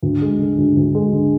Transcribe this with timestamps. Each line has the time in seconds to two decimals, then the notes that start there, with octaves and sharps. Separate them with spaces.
0.03 D2
0.22 G#3
0.39 D3
0.58 D2
0.77 D2
0.95 G#3
1.13 D3